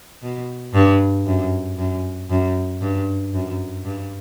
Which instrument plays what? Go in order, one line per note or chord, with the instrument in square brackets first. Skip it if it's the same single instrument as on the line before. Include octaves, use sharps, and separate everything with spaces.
[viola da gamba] B2
G2
F#2
F#2
F#2
G2
F#2
G2